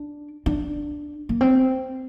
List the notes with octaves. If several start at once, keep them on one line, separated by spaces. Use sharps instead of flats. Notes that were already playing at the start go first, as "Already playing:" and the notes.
Already playing: D4
D4
A#3
C4